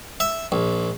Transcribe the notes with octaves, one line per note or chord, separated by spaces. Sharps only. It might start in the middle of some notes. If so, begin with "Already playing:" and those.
E5
A#1